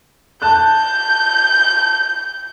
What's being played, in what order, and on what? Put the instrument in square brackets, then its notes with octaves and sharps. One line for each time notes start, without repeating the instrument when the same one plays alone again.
[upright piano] A5 F#6 [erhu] G6